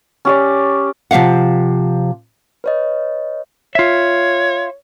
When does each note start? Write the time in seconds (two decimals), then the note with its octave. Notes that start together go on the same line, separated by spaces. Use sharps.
0.25 C#4 G4 D5
1.11 C3 F3 G4 F5 F#5
2.64 B4 C#5 D#5
3.75 F4 C#5 E5